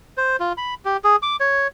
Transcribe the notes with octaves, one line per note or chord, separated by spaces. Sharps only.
C5
F4
B5
G4
G#4
D6
C#5